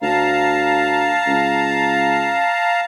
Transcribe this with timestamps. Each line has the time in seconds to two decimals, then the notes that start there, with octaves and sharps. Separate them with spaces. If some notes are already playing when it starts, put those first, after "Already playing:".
0.02 D2 F5 A5 A#5
1.26 C#2